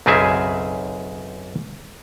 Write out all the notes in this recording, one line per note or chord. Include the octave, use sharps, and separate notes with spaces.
B1 F#2 C#3 C4 G#4 E5